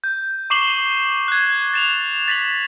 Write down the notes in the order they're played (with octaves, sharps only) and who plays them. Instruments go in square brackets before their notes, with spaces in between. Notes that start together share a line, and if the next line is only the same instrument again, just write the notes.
[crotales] G6
C#6 D6 C7 E7 F#7 G7
F#6 G#6
A6 E7 F7
A6 B6 E7 F#7